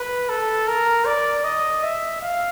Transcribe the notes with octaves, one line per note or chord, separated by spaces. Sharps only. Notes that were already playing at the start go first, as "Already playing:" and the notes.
Already playing: B4
A4
A#4
D5
D#5
E5
F5